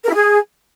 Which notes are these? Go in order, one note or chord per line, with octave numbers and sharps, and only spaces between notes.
A#4
E4
G#4